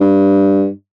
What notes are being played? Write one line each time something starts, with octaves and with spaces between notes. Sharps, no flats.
G2